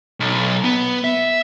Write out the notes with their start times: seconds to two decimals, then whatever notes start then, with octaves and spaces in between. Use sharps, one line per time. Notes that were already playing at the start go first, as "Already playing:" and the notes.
0.20 B1
0.64 B3
1.04 E5